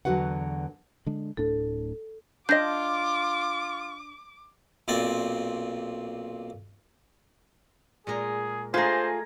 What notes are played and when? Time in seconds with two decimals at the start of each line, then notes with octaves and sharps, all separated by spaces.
0.05 E2 D3 F#3 F#4 B4 F#5
1.06 D3 G#3 D4
1.37 D1 A2 D4 A4
2.49 D4 F4 D#5 D6 G6 A#6
4.88 B1 A#2 C4 D5
8.07 A#2 G#3 G#4 A#4
8.74 A3 F4 G#4 A#4 C5 G#5 A#5